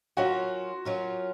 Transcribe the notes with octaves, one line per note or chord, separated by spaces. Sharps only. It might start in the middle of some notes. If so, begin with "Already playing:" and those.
F#3 C#4 F4 F#4 A#4
F#3 C#4 F4 A#4